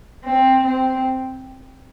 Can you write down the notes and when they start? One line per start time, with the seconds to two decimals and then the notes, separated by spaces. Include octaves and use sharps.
0.25 C4
0.64 C4